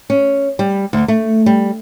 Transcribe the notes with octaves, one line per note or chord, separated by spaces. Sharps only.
C#4
G3
D2
A3
G3